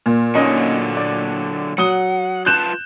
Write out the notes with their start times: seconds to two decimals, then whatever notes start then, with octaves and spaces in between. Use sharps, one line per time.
0.06 A#2
0.35 D3 F#3 C#4 D#4 D#5
0.97 D5
1.78 F#3 F#5 D#6 G7
2.46 F4 B4 A5 F#6 G6 E7